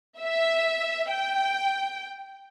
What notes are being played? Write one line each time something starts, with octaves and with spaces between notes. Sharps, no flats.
E5
G5